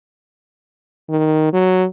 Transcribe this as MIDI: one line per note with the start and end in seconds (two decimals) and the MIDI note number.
1.10 1.50 51
1.53 1.85 54